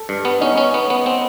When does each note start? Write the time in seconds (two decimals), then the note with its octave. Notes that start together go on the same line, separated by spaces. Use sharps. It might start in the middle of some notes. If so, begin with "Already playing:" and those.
Already playing: A4
0.09 G2
0.25 B3
0.41 C#4 D#4
0.58 C#4
0.74 B3
0.90 B3
1.06 C4